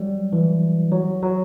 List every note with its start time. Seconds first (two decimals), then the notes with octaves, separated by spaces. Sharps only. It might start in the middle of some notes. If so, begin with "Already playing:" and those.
Already playing: F#3 G3
0.33 E3
0.92 F#3
1.22 F#3